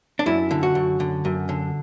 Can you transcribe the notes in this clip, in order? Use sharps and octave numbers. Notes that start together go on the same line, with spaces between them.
D4
F#2 E4
D3
F#4
F#2
D3
F#2
D3